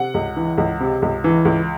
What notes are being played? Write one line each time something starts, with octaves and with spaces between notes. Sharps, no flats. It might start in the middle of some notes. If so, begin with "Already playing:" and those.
Already playing: C3 F#5
C#2
E3
C#2
C3
C#2
E3
C#2